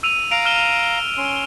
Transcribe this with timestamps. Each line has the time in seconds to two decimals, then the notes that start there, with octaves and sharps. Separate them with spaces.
0.03 E6 D#7 F7
0.31 F5 A#5 D7 F7
0.45 F6 E7 G7
1.18 C#4 C6